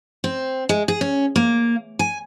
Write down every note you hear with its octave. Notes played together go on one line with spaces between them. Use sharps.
C4
G#3
G#4
C#4
A#3
G#5